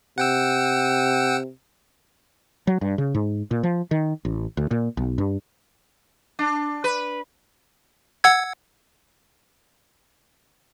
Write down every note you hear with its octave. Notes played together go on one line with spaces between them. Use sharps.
C3 F#5 G5 E6
F#3
G2
C#3
G#2
A#2
F3
D#3
A1
D2
A#2
B1
G2
D4
B4
F#5 E6 G#6